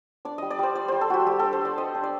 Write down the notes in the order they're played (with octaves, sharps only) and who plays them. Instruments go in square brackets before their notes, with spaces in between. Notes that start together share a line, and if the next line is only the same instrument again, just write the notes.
[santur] D4 D5
G3 D#5
D5
G3 C5
G3 D5
G3 C5
A4
G3 F#4 G4
G3 G4
D4 A4
C5
G3 D5
G3 D#5
D4
D5